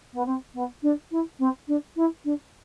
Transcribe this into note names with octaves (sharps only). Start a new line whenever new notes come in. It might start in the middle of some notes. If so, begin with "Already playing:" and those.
B3
C4
B3
D4
E4
C4
D4
E4
D4